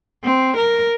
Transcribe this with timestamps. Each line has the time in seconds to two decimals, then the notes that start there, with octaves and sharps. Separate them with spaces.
0.24 C4
0.56 A#4